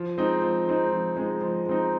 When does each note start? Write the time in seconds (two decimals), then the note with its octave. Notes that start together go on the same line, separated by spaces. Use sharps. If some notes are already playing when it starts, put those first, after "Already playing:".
Already playing: F3
0.17 G#3 C4 D#4
0.42 F3
0.68 G#3 C4 D#4
0.93 F3
1.17 G#3 C4 D#4
1.41 F3
1.66 G#3 C4 D#4